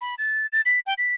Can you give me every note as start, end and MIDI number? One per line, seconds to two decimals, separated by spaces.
0.01 0.15 83
0.18 0.46 93
0.53 0.61 93
0.66 0.79 95
0.86 0.94 79
0.98 1.15 95